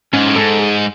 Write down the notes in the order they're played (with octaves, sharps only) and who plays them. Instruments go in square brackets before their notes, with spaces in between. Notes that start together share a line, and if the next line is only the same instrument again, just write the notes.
[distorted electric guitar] G#2 [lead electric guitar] C#4
[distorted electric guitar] A2
[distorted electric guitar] G#2 [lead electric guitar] A4
[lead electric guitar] G#4